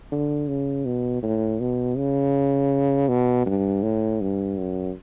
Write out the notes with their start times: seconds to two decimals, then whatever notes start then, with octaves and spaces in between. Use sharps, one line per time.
0.12 D3
0.48 C#3
0.85 B2
1.23 A2
1.60 B2
1.97 C#3
3.09 B2
3.46 G2
3.83 A2
4.21 G2
4.57 F#2